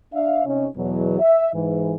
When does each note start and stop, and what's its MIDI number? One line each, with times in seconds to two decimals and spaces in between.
0.13 0.43 62
0.13 0.43 76
0.13 0.43 77
0.45 0.65 48
0.45 0.65 61
0.45 0.65 63
0.75 1.17 40
0.75 1.17 47
0.75 1.17 54
1.19 1.49 76
1.53 1.94 44
1.53 1.94 52